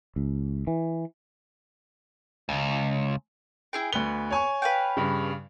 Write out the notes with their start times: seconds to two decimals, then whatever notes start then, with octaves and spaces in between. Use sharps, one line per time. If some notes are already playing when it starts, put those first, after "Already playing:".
0.16 C#2
0.67 E3
2.49 C#2
3.73 E4 G#4 G5
3.93 D2 B3 G7
4.31 C#5 G#5 C#6
4.62 B4 F5 G5
4.97 G2 C#3